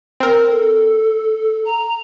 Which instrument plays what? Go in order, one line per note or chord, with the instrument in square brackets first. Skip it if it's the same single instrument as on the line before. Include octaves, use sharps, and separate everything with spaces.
[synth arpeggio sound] C4 A#4
[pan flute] A4
A#5